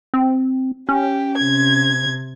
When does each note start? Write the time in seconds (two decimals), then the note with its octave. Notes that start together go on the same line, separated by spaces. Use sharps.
0.14 C4
0.89 C#4 G4
1.37 C3 G#6